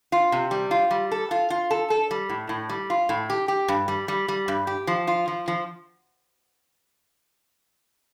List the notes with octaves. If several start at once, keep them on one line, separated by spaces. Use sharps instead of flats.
F4
C3
G3
F4
G3
A4
F4
F4
A4
A4
G3
A2
A2
G3
F4
A2
G4
G4
G2
G3
G3
G3
G2
G4
F3
F4
F3
F3